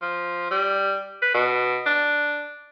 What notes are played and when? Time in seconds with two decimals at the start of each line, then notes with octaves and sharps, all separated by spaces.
0.02 F3
0.51 G3
1.22 B4
1.34 B2
1.86 D4